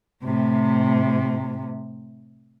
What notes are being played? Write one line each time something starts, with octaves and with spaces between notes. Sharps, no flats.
A2 C3